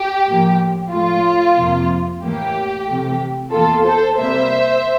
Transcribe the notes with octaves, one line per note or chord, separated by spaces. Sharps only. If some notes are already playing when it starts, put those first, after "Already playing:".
Already playing: G4
A2 F3 A#3
A2 F3 A3 F4
F2 C3 F3 A#3
A2 E3 A#3 G4
C3 E3 A3
E2 E3 A#3 F4 A4
A4 C5
C3 G3 A#3 C5 E5